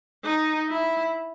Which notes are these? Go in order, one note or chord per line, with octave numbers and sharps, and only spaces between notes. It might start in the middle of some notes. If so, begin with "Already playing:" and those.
D#4
E4